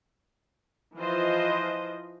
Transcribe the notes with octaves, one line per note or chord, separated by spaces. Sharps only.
E3 F3 F4 C5 D#5